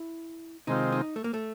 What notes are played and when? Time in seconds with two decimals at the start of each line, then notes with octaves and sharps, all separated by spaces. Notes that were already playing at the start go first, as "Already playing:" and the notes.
Already playing: E4
0.67 C3 D#3 G#3 C4 D#4 F4
0.92 D#4
1.16 A3
1.24 A#3
1.34 A3